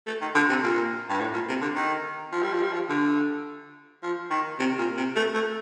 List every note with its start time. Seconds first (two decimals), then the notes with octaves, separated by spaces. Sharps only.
0.07 A3
0.21 D#3
0.35 D3
0.49 C3
0.63 A#2
1.09 G2
1.20 A2
1.34 A#2
1.48 C3
1.61 D3
1.75 D#3
2.32 F3
2.42 G3
2.53 F3
2.63 G3
2.73 F3
2.89 D3
4.03 F3
4.30 D#3
4.59 C3
4.78 A#2
4.97 C3
5.16 A3
5.34 A3